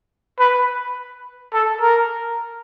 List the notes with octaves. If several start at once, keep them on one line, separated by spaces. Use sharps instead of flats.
B4
A4
A#4